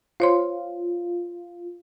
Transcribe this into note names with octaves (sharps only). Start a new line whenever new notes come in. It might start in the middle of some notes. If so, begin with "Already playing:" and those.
F4 C5 C#5 C6